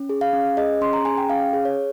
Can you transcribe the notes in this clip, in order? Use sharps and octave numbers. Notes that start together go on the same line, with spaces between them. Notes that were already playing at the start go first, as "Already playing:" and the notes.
Already playing: C#4
G#4
F5
C#4
G#4 D#5
C#4 C6
A#5
G#4 G#5
G5
C#4 F5
G#4
C#5